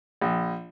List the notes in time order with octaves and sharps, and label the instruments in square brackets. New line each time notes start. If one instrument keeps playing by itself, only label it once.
[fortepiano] A#1